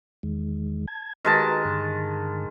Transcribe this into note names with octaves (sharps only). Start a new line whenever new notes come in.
E2 D#3 G#3
A5 G#6
D#3 G#3 F#4 B4 A5 A#5
G2 D3